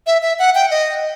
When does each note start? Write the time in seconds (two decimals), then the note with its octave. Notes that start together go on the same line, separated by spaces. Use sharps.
0.07 E5
0.22 E5
0.39 F#5
0.55 G5
0.71 D#5